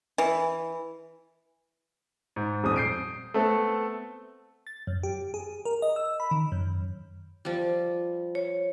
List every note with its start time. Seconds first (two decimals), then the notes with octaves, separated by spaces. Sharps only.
0.18 E3
2.36 G#2
2.64 D#1 F2 D#6
2.76 G6 C7 D7
3.34 A3 B3 C4 A4
4.67 A6
4.87 F#2
5.03 G4
5.34 G#4
5.65 A#4
5.82 D#5
5.96 E6
6.20 B5
6.31 D#3
6.52 F#2
7.45 F3 G3
8.35 C#5